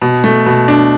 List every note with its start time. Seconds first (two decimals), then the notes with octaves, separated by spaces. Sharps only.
0.02 B2
0.24 A3
0.46 B2
0.68 D4